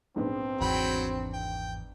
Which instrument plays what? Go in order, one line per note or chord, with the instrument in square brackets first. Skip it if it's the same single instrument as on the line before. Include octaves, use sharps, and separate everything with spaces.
[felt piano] A#1 G#2 B3 [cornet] C4
[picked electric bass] G#1 E2 [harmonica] F#3 G5 B5
[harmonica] G5